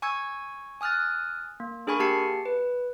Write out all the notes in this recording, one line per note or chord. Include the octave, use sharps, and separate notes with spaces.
G#5 C#6 E6 G#6
G#5 D#6 F6 F#6 A6
A#3
D4 G#4 A#4 G#5 B5 C#6
A#3 G4 A5 C7 C#7
B4